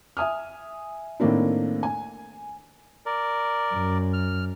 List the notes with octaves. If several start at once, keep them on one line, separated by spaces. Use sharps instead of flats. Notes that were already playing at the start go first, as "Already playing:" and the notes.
E5 G#5 D#6 F6
A2 D#3 A3 A#3 C4 D4
G#5
A#4 D5
F#2
F6